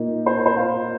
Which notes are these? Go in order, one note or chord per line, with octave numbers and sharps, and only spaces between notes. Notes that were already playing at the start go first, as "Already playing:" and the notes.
Already playing: A#2 A#3 D#4
C5
A#4
C5
F5